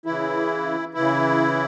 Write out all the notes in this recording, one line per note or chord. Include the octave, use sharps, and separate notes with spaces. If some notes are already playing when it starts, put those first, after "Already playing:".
C#3 E3 E4
C#3 E3 E4